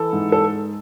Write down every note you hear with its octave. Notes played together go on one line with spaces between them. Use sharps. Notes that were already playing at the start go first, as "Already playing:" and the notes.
Already playing: E3 A4
G#2
A4